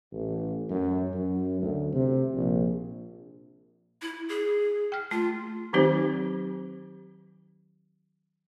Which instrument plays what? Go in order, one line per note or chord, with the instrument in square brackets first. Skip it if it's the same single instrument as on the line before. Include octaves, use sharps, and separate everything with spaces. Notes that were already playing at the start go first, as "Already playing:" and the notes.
[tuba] A1
F#2
F#2
D2
C3
A#1
[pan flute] E4
G#4
[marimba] G5 F6
[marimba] A3 [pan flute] F4
[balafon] D#3 F#3 C4 D#4 G4 C5